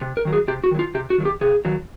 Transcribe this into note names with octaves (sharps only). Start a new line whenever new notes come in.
C3
A#4
D#3 F#3
G#4
C3 G4
F#4
D#3 F#3
F4
C3 G4
F#4
D#3 F#3
G4
C3 G#4
D#3 F#3